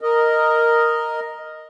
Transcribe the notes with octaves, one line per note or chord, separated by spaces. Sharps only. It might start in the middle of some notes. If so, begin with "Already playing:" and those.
A#4 D#5